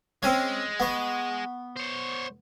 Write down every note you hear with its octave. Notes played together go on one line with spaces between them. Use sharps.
G#3 C4 C#4 C#5
B3 C#6
C5 C#5